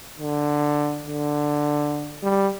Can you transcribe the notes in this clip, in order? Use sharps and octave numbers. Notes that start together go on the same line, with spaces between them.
D3
D3
G3